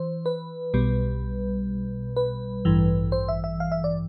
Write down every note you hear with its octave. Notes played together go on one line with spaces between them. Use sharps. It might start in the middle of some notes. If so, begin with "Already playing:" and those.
Already playing: E3 C5
B4
B1 B2 G3
B4
A1 G2 E3
C5
E5
E5
F5
E5
D5